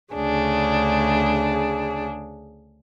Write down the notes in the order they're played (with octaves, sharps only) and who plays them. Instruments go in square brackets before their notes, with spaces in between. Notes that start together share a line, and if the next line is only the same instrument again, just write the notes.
[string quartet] D2 C#3 D4 G#4